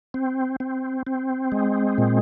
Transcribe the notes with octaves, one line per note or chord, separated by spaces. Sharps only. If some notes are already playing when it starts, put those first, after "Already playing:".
C4
C4
C4
G#3
A#2